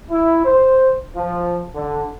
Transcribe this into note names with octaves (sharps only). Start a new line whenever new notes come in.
E4
C5
F3
D3